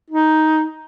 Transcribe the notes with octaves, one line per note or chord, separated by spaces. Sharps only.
D#4